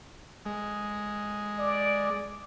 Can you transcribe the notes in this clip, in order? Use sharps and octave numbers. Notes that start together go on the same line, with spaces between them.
G#3
D5